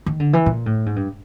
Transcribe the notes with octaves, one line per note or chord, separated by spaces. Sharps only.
D#3
D3
E3
A#2
A2
G#2
G2